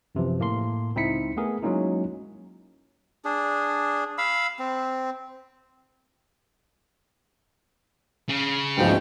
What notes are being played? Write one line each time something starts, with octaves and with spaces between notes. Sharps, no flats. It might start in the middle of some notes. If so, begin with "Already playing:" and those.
F#2 C3 E3 F3
A2 A#3 A5 C6
C#2 C4 D#4 E4 B6 C#7
A3 B3 G#4 A#4
F#3 G#3 A#3 C#4 D#4 E4
D4 G#4
F5 B5 E6
C4
C#3
D2 G#2 B2 F3 G5